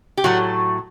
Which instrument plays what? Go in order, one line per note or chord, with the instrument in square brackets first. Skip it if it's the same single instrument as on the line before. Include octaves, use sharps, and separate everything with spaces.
[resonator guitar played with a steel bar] G4
A2 F#3 A3 F#4